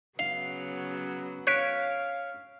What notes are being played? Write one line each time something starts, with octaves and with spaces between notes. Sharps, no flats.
C#3 F#3 B3 F5
C#5 F5 F#6 B6 D7